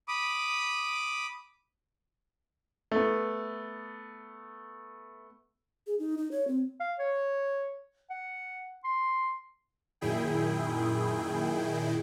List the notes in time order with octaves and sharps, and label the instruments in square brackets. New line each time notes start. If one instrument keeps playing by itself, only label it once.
[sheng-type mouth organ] B5 D6 D#6
[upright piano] A3 B3
[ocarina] G#4
D#4
D#4
C#5
C4
[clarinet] F5
C#5
F#5
C6
[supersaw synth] F#2 A#2 D#3 E4 G#4 G5